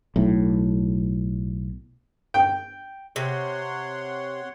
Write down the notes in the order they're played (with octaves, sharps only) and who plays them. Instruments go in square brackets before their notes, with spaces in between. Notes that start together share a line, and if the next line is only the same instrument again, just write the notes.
[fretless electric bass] B1 A2
[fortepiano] G5
[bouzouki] C3 [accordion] C#5 F#5 C6